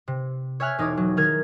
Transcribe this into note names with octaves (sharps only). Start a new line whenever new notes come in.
C3
C#5 E5 G#5 F6 F#6
E1 D#4 C#5 D6 D#6
F#3
D#3 D#4 G#4 A#4 F6 G#6